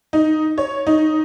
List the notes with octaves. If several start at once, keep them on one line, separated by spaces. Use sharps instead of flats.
D#4
C#5
D#4